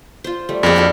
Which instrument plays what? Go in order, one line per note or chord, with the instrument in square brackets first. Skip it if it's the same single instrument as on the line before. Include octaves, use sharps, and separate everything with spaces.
[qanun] F4 C5
G3 A3
[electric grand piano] F2 [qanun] A#3 C4 G#4
[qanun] D4 F#4 A4